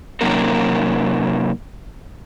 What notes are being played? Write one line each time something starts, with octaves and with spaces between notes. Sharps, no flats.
C3 F#3 A#3 C#4 D#4 A#4